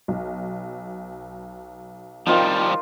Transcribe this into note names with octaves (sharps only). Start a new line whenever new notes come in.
B1
F3 G3 C4 D#4 F4 A#4 D#5 G5